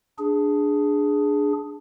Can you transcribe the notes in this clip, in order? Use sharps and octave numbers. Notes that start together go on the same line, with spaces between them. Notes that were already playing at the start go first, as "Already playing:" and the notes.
D4 G#4